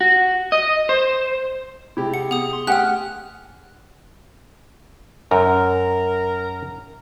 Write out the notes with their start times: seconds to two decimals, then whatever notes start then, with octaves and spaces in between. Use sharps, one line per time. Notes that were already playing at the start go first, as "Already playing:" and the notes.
0.01 F#4
0.52 D#5
0.89 C5
1.97 C3 G#3 E4 G4
2.14 F#5 C#7
2.31 B3 G#4 D#6
2.53 C6
2.67 A3 G4 F#5 G#5 D#6 F6 F#6
5.31 F#2 A#4